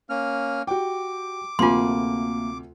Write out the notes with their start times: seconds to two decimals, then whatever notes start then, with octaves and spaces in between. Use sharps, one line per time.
0.09 A#3 C#4 F6
0.67 F#4 G4 G5 D6
1.59 D2 C3 A3 A#3 F4 G#5 C6